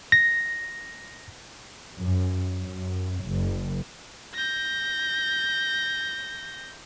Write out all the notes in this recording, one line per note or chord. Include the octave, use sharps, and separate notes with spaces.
A#6
F#2
F#2
F#1
G6 A#6